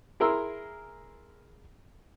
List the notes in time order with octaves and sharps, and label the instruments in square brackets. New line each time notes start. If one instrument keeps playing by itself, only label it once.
[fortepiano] E4 G#4 A#4 A#5 C6 E6